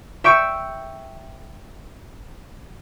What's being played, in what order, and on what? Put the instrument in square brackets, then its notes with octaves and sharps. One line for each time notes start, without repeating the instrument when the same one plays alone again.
[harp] E5 G5 C#6 E6 G6 D7